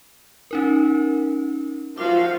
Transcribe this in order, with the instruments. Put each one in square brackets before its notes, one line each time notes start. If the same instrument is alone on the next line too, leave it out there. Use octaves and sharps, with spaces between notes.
[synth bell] C#4 D#4 A#4
[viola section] F3 F#4 F5 [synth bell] D6